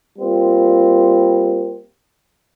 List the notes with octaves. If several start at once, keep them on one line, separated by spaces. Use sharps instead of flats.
G3 A#3 C4 F4